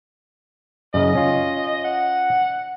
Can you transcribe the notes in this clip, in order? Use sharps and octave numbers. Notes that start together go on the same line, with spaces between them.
F#2 C#3 D#5
C#4 F4
F#5